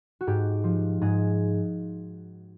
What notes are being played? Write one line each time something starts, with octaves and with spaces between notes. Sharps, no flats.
F#4
G#2 G4
F3
G#2 G#4